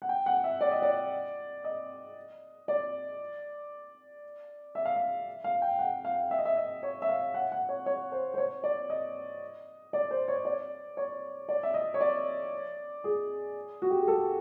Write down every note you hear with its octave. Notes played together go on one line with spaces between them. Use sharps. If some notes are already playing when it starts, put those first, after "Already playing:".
F#5
G5
F#5
E5
D5
D#5
D5
D#5
D5
E5
F5
E5
F5
G5
F#5
F5
E5
D#5
E5
D#5
C#5
E5
F5
F#5
F#5
C#5
C#5
C5
C5
C#5
D5
D#5
D5
C5
C#5
D5
C#5
D5
E5
D#5
C#5
D5
G#4
F#4
G4
G#4
A4